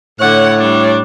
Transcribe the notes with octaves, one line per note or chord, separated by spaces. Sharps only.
A2 D3 C#5 F#5
G3 D4